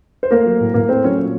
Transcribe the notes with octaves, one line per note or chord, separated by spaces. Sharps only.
C5
A3 A#3 A#4
F#3
A2
A2 A#3 A#4
A3 C4 C5
F#3 C#4 C#5
A#2